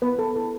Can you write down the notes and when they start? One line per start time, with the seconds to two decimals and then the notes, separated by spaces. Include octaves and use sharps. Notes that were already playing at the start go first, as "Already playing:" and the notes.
0.02 B3 B4
0.19 A4
0.35 E4 A4